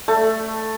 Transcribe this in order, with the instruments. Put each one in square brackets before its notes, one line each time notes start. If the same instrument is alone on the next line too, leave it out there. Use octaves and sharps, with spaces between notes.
[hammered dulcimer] A3